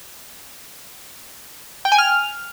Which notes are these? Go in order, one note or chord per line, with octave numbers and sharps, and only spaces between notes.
G5
G#5
F6